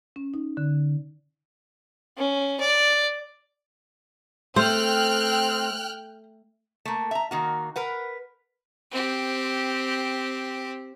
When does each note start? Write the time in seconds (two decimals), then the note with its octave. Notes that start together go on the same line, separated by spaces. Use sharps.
0.16 C#4
0.34 D#4
0.57 D3
2.17 C#4
2.60 D5
4.56 A3 C4 C5 G5 F6 F#6
6.85 A3 A#3
7.11 E5 A#5
7.31 D#3 A#3 F#4
7.76 A#4 B4 F#5
8.91 C4 G4